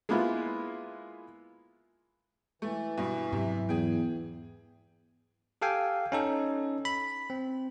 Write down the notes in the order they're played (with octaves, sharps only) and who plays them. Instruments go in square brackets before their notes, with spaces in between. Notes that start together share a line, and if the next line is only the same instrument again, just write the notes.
[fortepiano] G#3 A#3 B3 E4 F4
[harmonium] E3 [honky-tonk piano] A3
[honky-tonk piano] G2 B2
[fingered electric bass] G#2 F#3 [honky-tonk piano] C3
[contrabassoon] E2 [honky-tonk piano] G#4 G5
[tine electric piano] G4 A4 F5 G5 G#5
C#4 D#4 A4
B5
C4